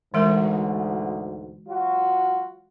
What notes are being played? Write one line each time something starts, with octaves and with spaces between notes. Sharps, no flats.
D2 G#2 B2 E3 G#3 A#4
F#3 F4 F#4